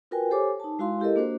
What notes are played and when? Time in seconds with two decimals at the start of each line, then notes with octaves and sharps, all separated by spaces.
0.11 F4 F#4 A#4 B4 G5 G#5
0.31 G4 A4 C5 C#5 G#5 D6
0.60 D#4 A5
0.79 G#3 E4 F#4 F5 C6
1.00 E4 G4 A4 A#4 D#5
1.16 A#3 D4 F#4 C5